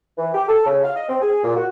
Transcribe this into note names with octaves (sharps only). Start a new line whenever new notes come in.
E3
G4
A4
C#3
F5
D#5
C4
G#4
A#2
F#4